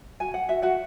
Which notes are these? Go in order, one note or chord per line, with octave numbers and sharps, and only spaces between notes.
F#4 G#5
F#5
F#4 E5
F#4 F#5